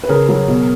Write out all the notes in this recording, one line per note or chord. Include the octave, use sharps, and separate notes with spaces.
B4
C#3 G#4 A#4
F#3
B2